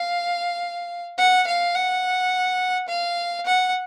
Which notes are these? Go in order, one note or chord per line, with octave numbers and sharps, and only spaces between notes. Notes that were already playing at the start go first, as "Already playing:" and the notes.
Already playing: F5
F#5
F5
F#5
F5
F#5